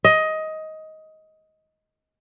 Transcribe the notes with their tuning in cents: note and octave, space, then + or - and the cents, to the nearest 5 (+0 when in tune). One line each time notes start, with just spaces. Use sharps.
D#5 +15